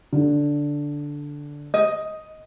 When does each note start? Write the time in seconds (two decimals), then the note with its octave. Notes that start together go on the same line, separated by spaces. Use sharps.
0.13 D3
1.74 D#5